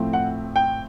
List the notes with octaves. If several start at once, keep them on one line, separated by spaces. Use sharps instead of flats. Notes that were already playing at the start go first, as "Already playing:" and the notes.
Already playing: A2 F3 A3 C4
F#5
G5